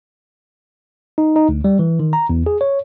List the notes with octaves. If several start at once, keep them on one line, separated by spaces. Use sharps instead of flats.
D#4
D#4
D2
G3
E3
D#3
A#5
E2
G#4
C#5